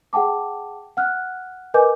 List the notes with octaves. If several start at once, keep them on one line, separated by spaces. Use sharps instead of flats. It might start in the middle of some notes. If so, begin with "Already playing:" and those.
G#4 F#5 G5 A5 D6
F#5 F6 F#6
A#4 B4 D#5 G#5 D6 G6